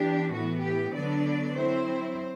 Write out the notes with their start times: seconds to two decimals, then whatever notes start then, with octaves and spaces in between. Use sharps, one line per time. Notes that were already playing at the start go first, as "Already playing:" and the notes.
Already playing: E3 B3 D4 G4
0.32 A2 E3 B3 F#4
0.62 G4
0.93 D3 F#3 B3 D4 D5
1.55 F#3 C4 E4 C5